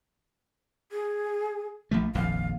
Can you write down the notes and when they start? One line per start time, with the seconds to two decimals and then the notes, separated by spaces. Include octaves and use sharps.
0.92 G#4
1.91 A#1 F3 A3
2.15 D#1 A#1 F2 F5